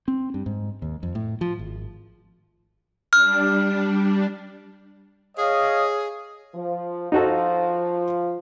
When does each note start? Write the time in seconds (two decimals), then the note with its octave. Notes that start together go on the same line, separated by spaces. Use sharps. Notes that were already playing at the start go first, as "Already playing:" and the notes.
0.08 C4
0.34 G2
0.46 G#2
0.82 D#2
1.03 F2
1.15 A2
1.41 F3
1.59 G#1
3.13 G3 D4 F6
5.38 G#4 C#5 D#5 F5
6.55 F3
7.12 F3 D#4 F#4 A4